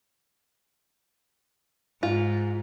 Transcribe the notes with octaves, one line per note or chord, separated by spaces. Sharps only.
G#2 F4